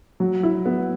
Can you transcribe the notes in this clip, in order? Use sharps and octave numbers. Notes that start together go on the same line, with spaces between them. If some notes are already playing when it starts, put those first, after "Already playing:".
F#3
E4
B3